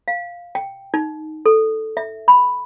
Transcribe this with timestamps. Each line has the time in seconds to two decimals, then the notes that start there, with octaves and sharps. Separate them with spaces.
0.08 F5
0.55 G5
0.94 D#4
1.46 A4
1.97 E5
2.28 B5